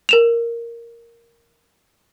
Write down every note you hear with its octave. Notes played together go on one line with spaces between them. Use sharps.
A#4 E7 F7